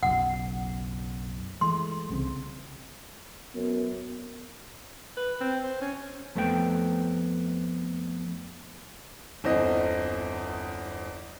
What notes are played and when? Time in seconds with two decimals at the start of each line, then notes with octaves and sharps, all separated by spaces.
0.03 F#1 B1 F#2 F#5
1.61 E3 G#3 A3 C6
2.10 C2 C#3 C4
3.55 F#2 B3
5.17 B4
5.41 C4
5.64 C5
5.81 C#4
6.35 F2 A3 B3 F#4 G5
9.44 G1 E2 C4 D#5